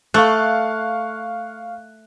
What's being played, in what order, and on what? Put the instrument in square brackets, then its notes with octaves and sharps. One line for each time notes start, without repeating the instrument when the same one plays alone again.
[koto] A3 [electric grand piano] F5 C#6 F#6